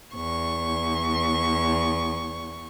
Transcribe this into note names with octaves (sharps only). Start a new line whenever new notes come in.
E2 C#6